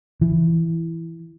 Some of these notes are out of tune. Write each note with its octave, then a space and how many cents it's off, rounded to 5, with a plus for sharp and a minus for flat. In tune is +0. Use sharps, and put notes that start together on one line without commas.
E3 +5